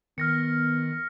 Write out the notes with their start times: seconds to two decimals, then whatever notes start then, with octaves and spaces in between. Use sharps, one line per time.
0.18 D#3 B3 F6 A#6 C#7